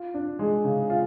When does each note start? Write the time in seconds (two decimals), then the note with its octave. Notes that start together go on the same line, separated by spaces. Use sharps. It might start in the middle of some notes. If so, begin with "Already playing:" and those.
Already playing: F4
0.14 D4
0.39 G#3
0.64 C#3
0.90 F4